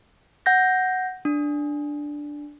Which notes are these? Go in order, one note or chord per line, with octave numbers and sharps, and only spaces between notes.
F#5 G6 A#6
D4